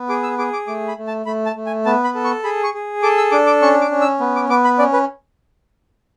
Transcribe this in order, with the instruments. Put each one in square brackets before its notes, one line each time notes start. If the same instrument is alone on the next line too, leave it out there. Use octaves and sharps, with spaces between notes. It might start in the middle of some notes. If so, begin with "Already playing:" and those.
Already playing: [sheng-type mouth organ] B3
G#4 D6
E6
G#4 D6
D6
A3 D6
B5
A3
A5
A3 B5
A5
A3
G#5
B3 A5
B5
A4
C#6
G#4 B5
C#6
G#4
A4 D6
E6
D4 D6
D6
C#4 C#6
D6
C#4
E6
B3
D6
B3 D6
B5
C#4 D5
B4